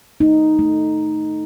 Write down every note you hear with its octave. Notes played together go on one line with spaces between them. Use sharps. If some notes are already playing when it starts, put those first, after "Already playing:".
A3 D#4
A3